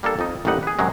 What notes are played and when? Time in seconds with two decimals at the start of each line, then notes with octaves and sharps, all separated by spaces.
0.03 G3 A#3 D4 A4
0.19 F2 D#4
0.45 A1 D#2 F3 G3 D#4 F#5
0.63 G#4 B4
0.79 F#2 C3 F#3 G#3